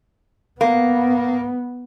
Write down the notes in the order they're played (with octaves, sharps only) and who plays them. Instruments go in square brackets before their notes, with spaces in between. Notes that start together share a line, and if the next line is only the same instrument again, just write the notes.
[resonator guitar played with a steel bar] A#3 [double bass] B3